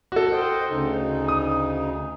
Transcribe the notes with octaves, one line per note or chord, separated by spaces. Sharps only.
F#4 A4
C5 D#5 G5
D2 C#3 D#4
D#6